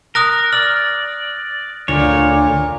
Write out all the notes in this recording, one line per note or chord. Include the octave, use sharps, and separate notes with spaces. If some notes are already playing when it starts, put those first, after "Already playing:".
A#4 D#6 F#6 A#6
D5 F6
D2 A#2 C#5